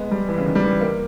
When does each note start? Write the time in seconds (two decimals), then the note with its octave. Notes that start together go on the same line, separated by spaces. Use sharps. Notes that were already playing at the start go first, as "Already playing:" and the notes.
Already playing: G#3 B3
0.11 G3
0.29 E3
0.38 C#3
0.45 D#3
0.55 G3
0.64 E3
0.81 A#3